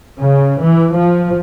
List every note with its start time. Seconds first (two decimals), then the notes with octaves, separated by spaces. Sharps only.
0.21 C#3
0.63 E3
0.96 F3